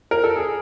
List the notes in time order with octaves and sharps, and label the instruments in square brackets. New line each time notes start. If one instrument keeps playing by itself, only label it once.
[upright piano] A#4
A4
G#4